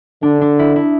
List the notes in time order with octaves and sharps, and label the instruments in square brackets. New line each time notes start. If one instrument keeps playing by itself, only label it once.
[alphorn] D3 [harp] D4
[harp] D4
E4
E4